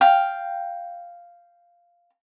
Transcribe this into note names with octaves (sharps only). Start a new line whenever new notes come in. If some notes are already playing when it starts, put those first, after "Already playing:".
F5 G5